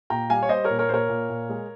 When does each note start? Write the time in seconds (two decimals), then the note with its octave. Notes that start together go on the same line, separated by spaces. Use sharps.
0.10 A#2 G5 A#5
0.30 G3 F5 G#5
0.43 C#5
0.49 G3 C5 D#5
0.64 A#4 C#5
0.70 A#2
0.79 A#4 C#5
0.89 A#2 C5
0.94 A#4 C#5
1.09 A#2
1.30 A#2
1.49 G#3